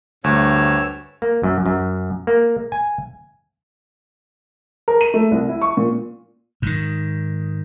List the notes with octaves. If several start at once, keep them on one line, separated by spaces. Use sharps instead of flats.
D2 G2 C#5 E6
A#3
F#2
F#2
A#3
G#5
A#4
D#7
A3
C2
E4
C#6
A#2
G#2 D#3